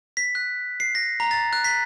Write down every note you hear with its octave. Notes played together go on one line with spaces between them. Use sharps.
B6
F#6
C7
A#6
A#5
A6
F#6
B6